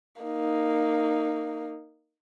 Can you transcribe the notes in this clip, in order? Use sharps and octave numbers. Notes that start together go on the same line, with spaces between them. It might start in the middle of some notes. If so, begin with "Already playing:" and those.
A#3 D#4